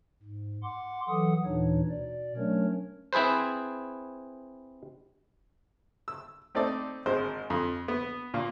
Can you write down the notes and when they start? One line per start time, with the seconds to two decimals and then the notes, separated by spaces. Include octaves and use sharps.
0.22 G#2
0.63 F#5 C6 D6
1.08 E3 F#3 A4 F#5 D#6
1.45 D#2 A#2 E3 D4 D#4 C#5
1.90 B2 D5
2.37 F#3 A3 C#4 D4 A#4 C#5
3.13 C4 E4 G#4 B4 C5
6.08 E6
6.55 A3 C4 D#4 A4 D5
7.06 G#1 G#3 C5
7.50 F2
7.88 B3
8.34 A#2 A#3